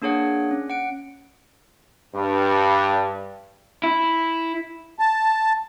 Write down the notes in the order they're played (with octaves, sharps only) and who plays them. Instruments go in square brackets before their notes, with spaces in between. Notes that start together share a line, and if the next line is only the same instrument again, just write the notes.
[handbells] A#3 D4 G#4 C#5 F#5
C#4
F#5 D7
[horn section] G2
[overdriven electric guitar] E4
[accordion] A5